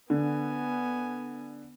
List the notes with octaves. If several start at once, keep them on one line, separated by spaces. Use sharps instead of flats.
D3 B3 G#5